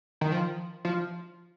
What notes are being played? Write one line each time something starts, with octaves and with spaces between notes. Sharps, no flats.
D#3
F3
F3